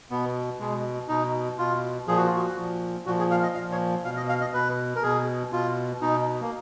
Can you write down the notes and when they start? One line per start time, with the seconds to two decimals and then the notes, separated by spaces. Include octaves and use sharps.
0.10 B2 B3
0.59 B2 G#3
1.08 B2 D#4
1.58 B2 F4
2.07 A#2 F3 G#4
2.17 F#4
2.26 F4
2.36 F#4
2.57 A#2 F3
3.06 A#2 F3 F#4
3.19 G#4
3.31 F5
3.43 D#5
3.55 A#2 F3 F5
3.72 C#5
4.04 B2 F5
4.17 D#5
4.29 F5
4.41 D#5
4.53 B2 B4
4.96 A#4
5.03 B2 G#4
5.52 B2 F4
6.01 B2 D#4
6.41 A#3